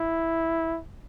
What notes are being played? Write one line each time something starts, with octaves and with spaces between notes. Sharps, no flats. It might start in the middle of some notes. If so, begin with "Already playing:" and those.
Already playing: E4